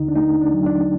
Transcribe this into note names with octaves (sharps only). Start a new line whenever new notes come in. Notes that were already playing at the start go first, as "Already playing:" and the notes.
Already playing: D#2 D3 D#4
D4
A3 D#4
D4
F#3
D4